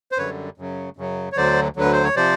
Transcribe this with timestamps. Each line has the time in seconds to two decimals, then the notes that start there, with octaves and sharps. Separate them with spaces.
0.12 C5
0.18 F#2 D3 G3 B4 C#5
0.58 F#2 C#3 F#3
0.97 F#2 C#3 F#3
1.32 C#5
1.36 D2 D3 F#3 C5 D5
1.76 D2 D3 F#3 B4
1.93 C5
2.03 C#5
2.16 C3 F3 C5 D5